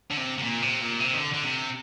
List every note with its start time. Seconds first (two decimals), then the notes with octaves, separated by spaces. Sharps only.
0.11 D3
0.17 C3
0.38 C3
0.42 A#2
0.62 C3
0.81 A#2
1.00 C3
1.13 D#3
1.18 D3
1.34 D3
1.44 C3